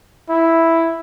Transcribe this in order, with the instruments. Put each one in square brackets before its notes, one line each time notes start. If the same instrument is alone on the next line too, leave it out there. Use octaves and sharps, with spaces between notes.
[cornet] E4